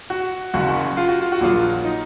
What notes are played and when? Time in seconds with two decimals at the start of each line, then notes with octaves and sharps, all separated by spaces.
0.10 F#4
0.54 F#1 F#2 C#3 F#4
0.97 F4
1.08 F#4
1.21 F4
1.32 F#4
1.41 A#1 A#2 F#3 F4
1.84 D#4